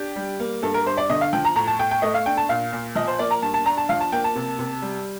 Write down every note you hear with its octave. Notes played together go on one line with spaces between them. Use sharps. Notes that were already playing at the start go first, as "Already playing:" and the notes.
Already playing: D4 G4
G3
A#3
G2 A4
A#4
G2 C5
D5
D3 D#5
F5
F3 G5
A#5
A2 A#5
A5
A2 G5
G5
A3 D#5
F5
D4 G5
A5
A#2 F5
A#2
F3 D#5
C5
A#3 D5
A#5
G2 A5
A5
D4 A#5
A5
F3 F5
A5
A#3 G5
A5
C3
C3
G3